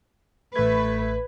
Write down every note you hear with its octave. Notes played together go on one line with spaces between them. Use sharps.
A1 A3 B4 G#6